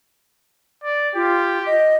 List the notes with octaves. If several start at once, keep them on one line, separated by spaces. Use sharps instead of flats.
D5
F4 G4
D#5